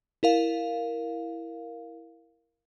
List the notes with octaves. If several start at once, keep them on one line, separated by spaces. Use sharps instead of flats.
E4 A#4 F5